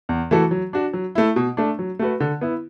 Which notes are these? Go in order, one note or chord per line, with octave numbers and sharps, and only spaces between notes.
E2
E3 A3 F#4 A4
F#3
D4 F#4
F#3
A3 E4
B2
A3 D4
F#3
A3 F#4 B4
D3
B3 E4